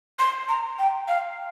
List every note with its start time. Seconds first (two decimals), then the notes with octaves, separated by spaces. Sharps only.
0.19 C6
0.48 A#5
0.79 G5
1.08 F5